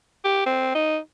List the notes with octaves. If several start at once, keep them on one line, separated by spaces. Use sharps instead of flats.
G4
C4
D#4